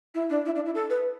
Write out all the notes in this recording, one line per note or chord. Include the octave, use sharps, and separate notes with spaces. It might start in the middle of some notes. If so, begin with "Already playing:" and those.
E4
D4
E4
D4
E4
A4
B4